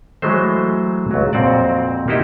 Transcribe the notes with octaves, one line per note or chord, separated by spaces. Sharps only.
E3 F#3 G#3 A3 C5
C#2 F#3
F2 A#2 C4 F#4 D5
A#3 D#4 E4 F#4 G4 D#5